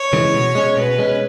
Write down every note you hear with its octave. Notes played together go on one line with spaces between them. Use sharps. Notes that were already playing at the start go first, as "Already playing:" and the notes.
Already playing: C#5
C#3 E3 G#3
B2
G#3 C#4
B2 B4
G#3 C#4